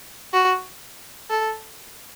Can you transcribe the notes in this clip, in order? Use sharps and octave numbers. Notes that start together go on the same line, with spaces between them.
F#4
A4